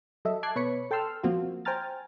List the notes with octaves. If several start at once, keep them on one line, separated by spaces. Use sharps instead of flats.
F#3 A4 D#5 E5
A5 D6 F#6 G#6 C7
B2 B4 C#5 B5 C#7
A4 G5 A5 C6 E6 F6
F3 A#3 C4 F4 F#4
C5 G5 G#5 A#5 F6 A6